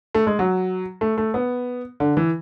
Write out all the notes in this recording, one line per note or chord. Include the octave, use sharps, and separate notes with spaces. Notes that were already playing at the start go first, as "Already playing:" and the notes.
A3
G#3
F#3
A3
A3
B3
D3
E3